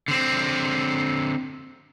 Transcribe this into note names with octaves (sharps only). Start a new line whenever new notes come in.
D3 C4